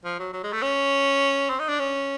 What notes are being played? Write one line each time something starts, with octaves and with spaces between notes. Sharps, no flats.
F3
F#3
F#3
G#3
A3
C#4
C4
D#4
D4
C#4